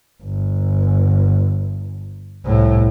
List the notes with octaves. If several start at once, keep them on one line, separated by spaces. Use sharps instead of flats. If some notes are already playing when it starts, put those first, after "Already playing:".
G1
C2 A2